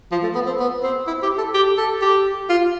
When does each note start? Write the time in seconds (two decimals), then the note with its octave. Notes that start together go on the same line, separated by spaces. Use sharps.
0.11 F3
0.23 A3
0.35 B3
0.46 C4
0.59 B3
0.83 C4
1.07 E4
1.23 G4
1.38 A4
1.54 G4
1.77 A4
2.02 G4
2.49 F4